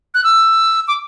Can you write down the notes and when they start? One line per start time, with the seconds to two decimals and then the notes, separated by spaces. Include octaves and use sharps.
0.14 F#6
0.24 E6
0.88 D6